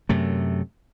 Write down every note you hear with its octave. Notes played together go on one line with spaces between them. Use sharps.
F#2 C3 A3